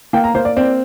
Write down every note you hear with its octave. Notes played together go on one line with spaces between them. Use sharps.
A#3 G5
A#5
A#3 C5
D5
C4 D5